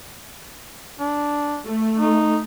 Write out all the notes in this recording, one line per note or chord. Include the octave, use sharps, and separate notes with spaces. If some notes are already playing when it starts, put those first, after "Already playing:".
D4
A3
D#4